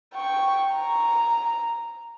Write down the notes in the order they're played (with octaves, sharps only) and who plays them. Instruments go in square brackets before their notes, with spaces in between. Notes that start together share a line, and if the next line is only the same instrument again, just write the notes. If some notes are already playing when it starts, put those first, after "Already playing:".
[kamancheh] G5 C#6
A#5